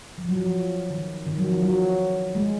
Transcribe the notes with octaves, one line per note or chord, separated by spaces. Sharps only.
F3
F#3
F3
D#3
D#3
F#3
F3
F#3
G#3